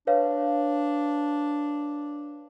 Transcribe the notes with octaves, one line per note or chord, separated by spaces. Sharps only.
D4 B4 C#5 F5